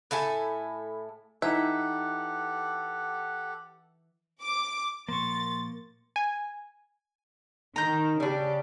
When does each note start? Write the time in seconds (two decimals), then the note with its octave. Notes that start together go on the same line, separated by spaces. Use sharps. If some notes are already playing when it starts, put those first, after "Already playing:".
0.11 A2 A4 E5 G#5
1.42 E3 D#4 G4 A4 E5 F#5
4.42 D6
5.08 A#2 F3 A#3 C6 C#6 A6
6.16 G#5
7.76 D#3 A#5 G6
8.20 C#3 G3 D4 G4